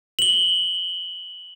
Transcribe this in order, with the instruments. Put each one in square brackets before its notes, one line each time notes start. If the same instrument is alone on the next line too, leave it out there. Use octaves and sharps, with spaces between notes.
[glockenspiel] F#7 G7